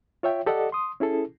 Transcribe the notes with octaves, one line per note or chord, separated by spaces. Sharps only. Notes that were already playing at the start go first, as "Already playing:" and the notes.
F4 C#5 E5 G5
G4 A4 D5 D#5 F#5
C6 D#6
C#4 E4 G#4 A4